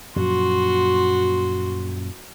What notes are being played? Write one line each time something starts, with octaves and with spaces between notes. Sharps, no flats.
F#2 A#2 F3 F#4 C6